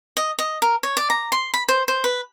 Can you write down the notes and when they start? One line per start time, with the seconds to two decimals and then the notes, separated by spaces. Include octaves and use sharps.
0.17 D#5
0.39 D#5
0.62 A#4
0.83 C#5
0.97 D5
1.10 A#5
1.32 C6
1.54 B5
1.69 C5
1.88 C5
2.04 B4